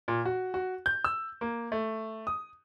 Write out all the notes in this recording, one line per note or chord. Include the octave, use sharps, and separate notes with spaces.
A#2
F#4
F#4
G6
E6
A#3
A3
D#6